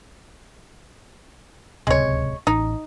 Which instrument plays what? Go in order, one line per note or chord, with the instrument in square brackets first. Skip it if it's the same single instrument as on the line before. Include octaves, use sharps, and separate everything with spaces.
[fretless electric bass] D1 C#2 C3 [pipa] G#3 C#5
[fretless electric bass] A1 [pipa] D#4